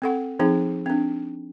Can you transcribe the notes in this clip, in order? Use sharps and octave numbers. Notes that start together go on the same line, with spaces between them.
C4 A4 F#5
F3 C4 D#4 G#4
C4 D4